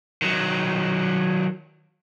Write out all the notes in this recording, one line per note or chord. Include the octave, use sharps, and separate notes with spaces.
D#3 F#3